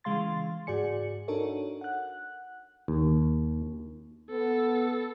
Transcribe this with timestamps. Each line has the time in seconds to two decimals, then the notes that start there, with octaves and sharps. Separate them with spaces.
0.04 C#3 E3 G#3 F5 C6 A6
0.67 G#2 F#4 G#4 D5 G#5 C#7
1.28 D4 D#4 F#4 A4 A#4 C#5
1.81 F#5 F#6
2.88 D#2
4.31 B3 A4